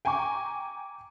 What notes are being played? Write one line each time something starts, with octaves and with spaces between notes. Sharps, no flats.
G5 G#5 A#5 C#6 D6